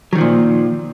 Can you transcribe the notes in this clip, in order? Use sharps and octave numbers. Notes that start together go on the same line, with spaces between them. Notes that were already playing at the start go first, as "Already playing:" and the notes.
A#2 D#3 F3 F#3